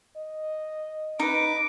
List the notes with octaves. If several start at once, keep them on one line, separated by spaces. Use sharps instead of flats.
D#5
D#4 B4 D6